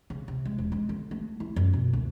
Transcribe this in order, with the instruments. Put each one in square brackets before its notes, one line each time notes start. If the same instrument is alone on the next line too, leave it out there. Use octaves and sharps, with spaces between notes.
[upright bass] C#3
C3
G#3
E1
G#3
D3
A3
E4
F#2
B2
D2